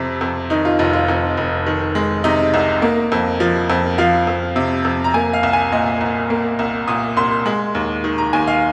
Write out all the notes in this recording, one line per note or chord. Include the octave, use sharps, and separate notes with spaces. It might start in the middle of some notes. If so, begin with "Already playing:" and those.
Already playing: F2 C3
F2
D#3 D#4
F4
F1 F4
F4
F2 D#4
F1
D#3
G#3
C3 D#4
C2
A#3
F2
F3
F2
F3 F5
F2
C3
F2
A#5
A#3 G#5
F5
C2
G#5
A#2 D#5
C2
A#3
C2
A#2 D#6
C2 C6
G#3
D#2
D#3
A#5
D#2 G#5
F5